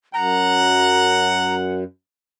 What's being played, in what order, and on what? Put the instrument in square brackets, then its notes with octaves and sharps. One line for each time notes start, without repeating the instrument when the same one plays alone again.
[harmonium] F#2 [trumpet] F#5 [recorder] A#5